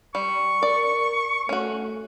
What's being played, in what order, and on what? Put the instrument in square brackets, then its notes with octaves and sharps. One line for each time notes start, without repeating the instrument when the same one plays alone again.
[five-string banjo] G3 [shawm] C#6
[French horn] A#4 [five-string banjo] D5
[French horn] A3 [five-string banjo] C#4 F#4